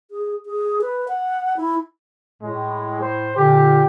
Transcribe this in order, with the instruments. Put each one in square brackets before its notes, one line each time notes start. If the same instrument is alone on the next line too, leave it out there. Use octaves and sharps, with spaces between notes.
[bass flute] G#4
G#4
B4
F#5
E4
[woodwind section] A2 [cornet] G#3
[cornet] C5
[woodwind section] A#2 D3 [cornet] G4